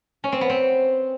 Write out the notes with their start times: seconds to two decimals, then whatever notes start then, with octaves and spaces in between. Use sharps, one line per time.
0.24 C#4
0.32 C4
0.41 B3
0.50 C4